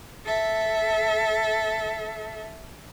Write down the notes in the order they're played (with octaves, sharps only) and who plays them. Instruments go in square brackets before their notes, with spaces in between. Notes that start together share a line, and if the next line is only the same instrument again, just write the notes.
[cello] A4 E5